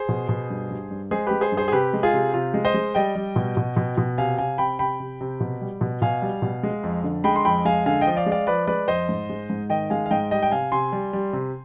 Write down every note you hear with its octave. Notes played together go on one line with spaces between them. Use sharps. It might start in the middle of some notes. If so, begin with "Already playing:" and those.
Already playing: G#4 C5
B2
B2
G2
G2
G2
G#3 G#4 C5
G#3 G4 B4
G#4 C5
G2
G#4 C5
G#4
C3 G4 B4
G#3
F4 G#4
C3
C3 F4
G#3
C5 D#5
G#3
G3 D#5 G5
G3
B2
B2
B2
B2
C3 F5 G#5
C3 F5 G#5
C3 G5 B5
C3 G5 B5
C3
C3
B2
G3
B2
B2 F5 G#5
G3
B2
G#3
F2
D3
G#3 G5 B5
C6
F2 G5 B5
G#3 F5 G#5
D3 F5 G#5
D#5 G5
F3
D5 F5
G#3
D5 F5
F3 B4 D5
G#3 B4 D5
F2 C5 D#5
G#2
G#3
G#2
D#3 D#5 G5
G#3 F5 G#5
F5
G#2 D#5 G5
G3 D#5 G5
G5
C3 F5 G#5
C3 G#5 C6
G3
G3
C3